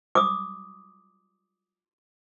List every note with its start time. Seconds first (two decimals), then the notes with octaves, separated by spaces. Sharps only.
0.15 D6 D#6